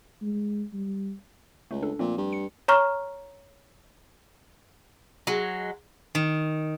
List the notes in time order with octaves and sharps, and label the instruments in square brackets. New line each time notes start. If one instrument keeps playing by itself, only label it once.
[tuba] G#3
G3
[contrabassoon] C#2 [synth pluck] A3
[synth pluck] D4 A4
[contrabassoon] A#2 [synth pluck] F3 A3 C4
[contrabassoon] G2
[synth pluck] C#7
[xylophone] C#5 A#5 C#6 F6
[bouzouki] F#3 G#3
[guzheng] D#3